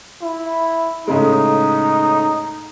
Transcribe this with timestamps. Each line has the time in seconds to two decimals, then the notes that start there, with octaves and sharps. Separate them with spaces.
0.22 E4
1.07 A2 C#3 G#3 D#4